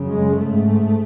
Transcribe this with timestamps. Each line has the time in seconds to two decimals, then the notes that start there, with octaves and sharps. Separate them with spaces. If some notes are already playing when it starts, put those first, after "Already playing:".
Already playing: F#2 C#3
0.10 G#3
0.38 G#2 A3